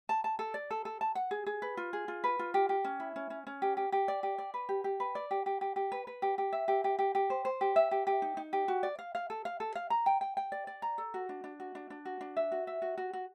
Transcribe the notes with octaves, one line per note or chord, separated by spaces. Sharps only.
A5
A5
A4
D5
A4
A4
A5
F#5
G#4
G#4
B4
F4
G#4
F4
B4
F4
G4
G4
C#4
E4
C#4
C#4
C#4
G4
G4
G4
D5
G4
D5
B4
G4
G4
B4
D5
G4
G4
G4
G4
B4
B4
G4
G4
E5
G4
G4
G4
G4
C5
C5
G4
E5
G4
G4
D#4
D#4
G4
F#4
D5
F5
F5
A4
F5
A4
F5
A#5
G5
G5
G5
D5
D5
A#5
A4
F#4
D4
D4
F#4
D4
D4
F#4
D4
E5
F#4
E5
F#4
F#4
F#4